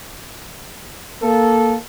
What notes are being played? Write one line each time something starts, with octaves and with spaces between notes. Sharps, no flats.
A#3 A4